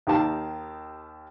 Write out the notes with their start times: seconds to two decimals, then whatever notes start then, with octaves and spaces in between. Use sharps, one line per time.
0.07 D#2 D#3 G4 F5 A5